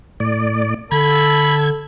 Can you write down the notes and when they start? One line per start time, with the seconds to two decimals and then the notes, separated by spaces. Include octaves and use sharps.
0.20 A2 D5
0.92 D3 A4 B5 G#6